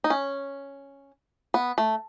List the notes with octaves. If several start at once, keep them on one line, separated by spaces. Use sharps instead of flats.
D#4
C#4
B3
A3